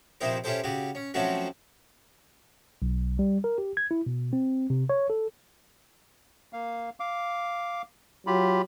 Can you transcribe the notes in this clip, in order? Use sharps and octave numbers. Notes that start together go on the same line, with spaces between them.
A#1 C3 D#4 E4 G4 C5
C#4 E4 F4 G4 A4 C5
C#3 F#4 G4
C#4
F3 F#3 A3 C4 C#4 F#4
B1
G3
A#4
G4
G#6
E4
B2
C4
C3
C#5
A4
A#3 F5
F5 D6
F#3 F4 G4 B5